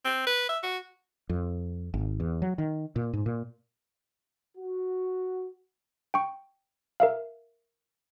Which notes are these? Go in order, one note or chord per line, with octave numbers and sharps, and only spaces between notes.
C4
B4
E5
F#4
F2
G#1
E2
F#3
D#3
A#2
G#2
A#2
F#4
G5 C#6
A#4 E5 F5